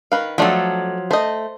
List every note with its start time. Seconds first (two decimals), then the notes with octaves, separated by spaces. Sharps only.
0.12 D#3 B4 F5
0.38 F3 F#3 A3 D4 A4
1.11 A3 C5 D#5